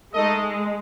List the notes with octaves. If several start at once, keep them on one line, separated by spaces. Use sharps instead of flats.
G#3 A3 D#4 A4 D#5